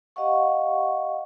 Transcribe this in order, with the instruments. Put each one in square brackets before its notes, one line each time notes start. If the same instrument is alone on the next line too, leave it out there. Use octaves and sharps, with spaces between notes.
[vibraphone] G4 D#5 F5 F#5 C#6